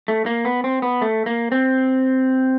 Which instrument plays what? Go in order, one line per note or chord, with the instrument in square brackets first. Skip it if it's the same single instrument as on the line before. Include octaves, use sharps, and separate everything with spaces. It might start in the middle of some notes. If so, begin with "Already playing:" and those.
[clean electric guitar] A3
A#3
B3
C4
B3
A3
A#3
C4